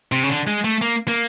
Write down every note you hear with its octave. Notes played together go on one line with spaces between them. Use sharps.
C3
C#3
D3
G#3
A3
A#3
A#3